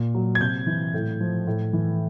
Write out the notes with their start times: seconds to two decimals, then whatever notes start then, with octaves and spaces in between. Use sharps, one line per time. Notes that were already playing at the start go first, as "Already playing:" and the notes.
Already playing: A#2
0.15 F#3
0.35 G#6
0.41 C3 G6
0.67 E3
0.94 A2
1.21 F3
1.47 A2
1.73 E3